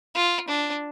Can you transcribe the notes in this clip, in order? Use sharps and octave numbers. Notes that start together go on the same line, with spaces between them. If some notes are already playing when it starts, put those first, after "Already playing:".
F4
D4